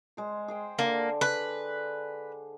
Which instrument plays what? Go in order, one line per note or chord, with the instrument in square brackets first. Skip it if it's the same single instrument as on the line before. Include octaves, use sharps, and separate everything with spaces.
[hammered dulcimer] G#3 C5
G#4 C5 G5
[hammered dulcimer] D3 [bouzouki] A#3
[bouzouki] B4